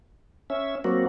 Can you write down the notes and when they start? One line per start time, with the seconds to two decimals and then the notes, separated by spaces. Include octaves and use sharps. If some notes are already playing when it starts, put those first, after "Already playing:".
0.50 C#4 E5
0.84 F#3 A#3 C4 F#4